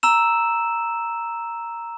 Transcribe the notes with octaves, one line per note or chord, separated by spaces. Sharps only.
A#5 E6 E7